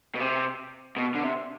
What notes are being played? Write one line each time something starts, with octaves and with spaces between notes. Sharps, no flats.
B2
C3
B2
D3
C3